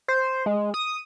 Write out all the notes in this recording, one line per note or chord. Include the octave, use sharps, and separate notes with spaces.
C5
G#3
D#6